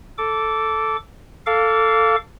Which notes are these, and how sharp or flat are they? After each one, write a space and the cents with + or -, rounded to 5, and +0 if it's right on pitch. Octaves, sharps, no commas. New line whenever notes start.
A4 +0 D6 -15
A4 +10 F5 +0 D6 -30